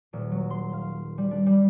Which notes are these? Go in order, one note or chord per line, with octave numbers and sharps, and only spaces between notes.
D#1
F#3
C6
F5
G3
D4
G3